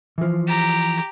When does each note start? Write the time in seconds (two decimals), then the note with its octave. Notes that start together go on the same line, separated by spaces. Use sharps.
0.18 E3 F3
0.47 G4 A#5